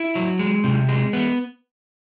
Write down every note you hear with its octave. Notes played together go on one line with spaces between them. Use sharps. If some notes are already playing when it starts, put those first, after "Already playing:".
Already playing: E4
F#3
G#3
C3
G#3
B3